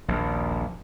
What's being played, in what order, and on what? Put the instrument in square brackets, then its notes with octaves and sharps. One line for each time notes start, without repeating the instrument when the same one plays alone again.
[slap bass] A#1 D#2